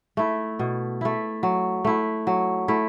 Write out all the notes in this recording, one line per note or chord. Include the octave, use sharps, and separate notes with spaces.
A3 E4
B2
A3 E4
F#3
A3 E4
F#3
A3 E4